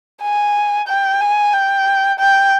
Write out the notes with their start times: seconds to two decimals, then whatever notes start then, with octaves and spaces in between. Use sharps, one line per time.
0.22 G#5
0.88 G5
1.21 G#5
1.53 G5
2.20 G5